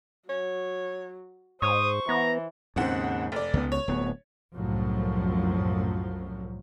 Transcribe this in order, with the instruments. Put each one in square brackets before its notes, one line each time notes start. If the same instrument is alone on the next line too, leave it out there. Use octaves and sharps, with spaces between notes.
[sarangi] F#3 [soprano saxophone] C#5
[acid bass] G#2 [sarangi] C5 [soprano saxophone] C#6 [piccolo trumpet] D#6
[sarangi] E3 [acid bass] B3 [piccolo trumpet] A#5
[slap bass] D#2 G#2 [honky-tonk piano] C#3 C4 F#5
[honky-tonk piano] F1 D5
[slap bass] C#2 B3
[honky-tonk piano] C#5
[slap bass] D1 B3
[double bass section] C2 F#2 A2 F3 F#3